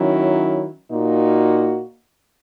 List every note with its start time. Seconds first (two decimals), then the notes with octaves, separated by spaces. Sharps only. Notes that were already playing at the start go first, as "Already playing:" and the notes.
Already playing: D#3 F#3 C#4 E4
0.91 A#2 A#3 D#4 F#4